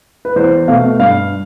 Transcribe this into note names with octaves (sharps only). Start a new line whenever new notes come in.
B4
E2 C5
B2 A3 F5
G2 F5